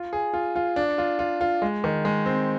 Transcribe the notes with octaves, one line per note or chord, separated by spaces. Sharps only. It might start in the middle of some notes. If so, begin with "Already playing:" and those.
Already playing: F4
G#4
F4
F4
D4
F4
F4
F4
G#3
D#3
G#3
C4